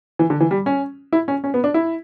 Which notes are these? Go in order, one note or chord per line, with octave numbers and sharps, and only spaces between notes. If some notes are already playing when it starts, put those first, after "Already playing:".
E3
D3
E3
G3
C#4
E4
C#4
C#4
B3
D4
E4